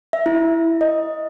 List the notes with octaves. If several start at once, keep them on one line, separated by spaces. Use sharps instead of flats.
E5
E4
D#5